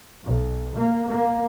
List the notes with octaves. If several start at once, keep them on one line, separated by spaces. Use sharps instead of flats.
B1
A#3
A#3